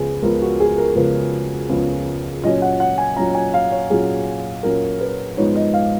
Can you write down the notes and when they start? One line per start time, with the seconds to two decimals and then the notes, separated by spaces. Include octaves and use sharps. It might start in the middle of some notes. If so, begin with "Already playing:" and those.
Already playing: C#2 C#3 F3 B3 G#4
0.22 C#2 C#3 F3 B3 A#4
0.42 F#4
0.60 G#4
0.78 A#4
0.96 C#2 C#3 F3 B3 B4
1.69 C#2 C#3 F3 B3
2.44 A#2 F#3 C#4 D#5
2.62 F#5
2.80 F#5
2.98 G#5
3.16 A#2 F#3 C#4 A#5
3.34 G#5
3.54 F5
3.72 C#5
3.90 A#2 F#3 C#4 G#4
4.63 A#2 F#3 C#4 A#4
5.01 B4
5.37 G#2 F3 B3 D#4 C#5
5.55 D#5
5.74 F5